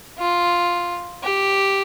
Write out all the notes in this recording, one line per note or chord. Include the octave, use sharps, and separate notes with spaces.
F4
G4